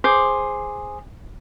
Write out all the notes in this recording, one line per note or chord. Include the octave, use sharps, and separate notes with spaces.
G#4 C5 D6